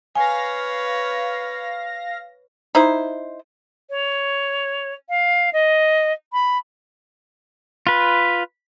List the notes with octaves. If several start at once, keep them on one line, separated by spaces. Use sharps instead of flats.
B4 C#5 F5 G#5 A#6
D#4 E4 C5
C#5
F5
D#5
B5
F4 B4